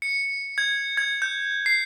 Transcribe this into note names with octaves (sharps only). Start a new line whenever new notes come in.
C#7
G#6
G#6
G6
C7